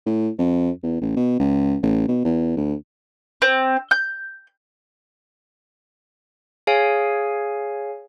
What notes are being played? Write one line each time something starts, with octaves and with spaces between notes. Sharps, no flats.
A2
F2
E2
A1
B2
C#2
A1
B2
E2
D2
C4
G6
G#4 C#5 F5 G#5